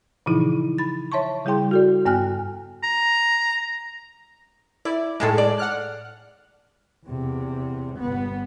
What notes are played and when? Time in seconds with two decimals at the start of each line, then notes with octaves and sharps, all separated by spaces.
0.26 A#2 C#3 E3 F3 D#4 E4
0.78 B5 A6
1.12 C#5 E5 A5 C6 C#6
1.45 C#3 G3 E4 G#4 G5 C6
1.71 F#4 A4 D5
2.05 G2 B3 G5 G#5 F6 F#6
2.83 A#5
4.85 E4 D5
5.20 A2 D#3 G#3 G#4 A4
5.38 D5
5.58 F#5 F6 F#6
7.06 E2 C3
7.97 G1 B3